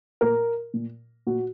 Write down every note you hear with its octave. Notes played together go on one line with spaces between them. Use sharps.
A#2 A#4
A#2
A#2 F#4